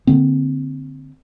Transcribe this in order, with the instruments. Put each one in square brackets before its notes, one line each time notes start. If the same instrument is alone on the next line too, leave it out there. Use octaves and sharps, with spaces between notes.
[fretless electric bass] D3 A#3 C4